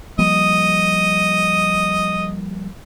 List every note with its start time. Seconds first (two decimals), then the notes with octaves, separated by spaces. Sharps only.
0.19 F3 G3 A#3 D#5 D#7